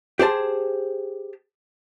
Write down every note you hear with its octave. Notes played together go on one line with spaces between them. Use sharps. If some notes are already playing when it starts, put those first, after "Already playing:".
G4 G#4 C5 A5